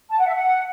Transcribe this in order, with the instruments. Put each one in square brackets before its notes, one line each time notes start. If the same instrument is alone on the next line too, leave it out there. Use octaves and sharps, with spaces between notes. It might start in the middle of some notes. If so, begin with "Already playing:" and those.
[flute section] A5
F#5
E5
F#5